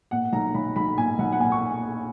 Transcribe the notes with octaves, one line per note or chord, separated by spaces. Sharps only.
A#2 F#5
B1 A#5
B1 B5
B1 B5
A#2 G#5
B1 F#5
F#5
A#2 G#5
C#6